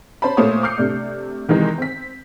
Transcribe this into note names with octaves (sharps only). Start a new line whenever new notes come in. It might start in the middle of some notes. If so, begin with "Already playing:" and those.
C#4 C5 A5 B5
A#2 A3 F4 C5 C#5 D#6
D6 D#6 F6 G6 C7 C#7
C3 A3 D4
C3 D#3 E3 G#3 D#4 G#4
C4 B6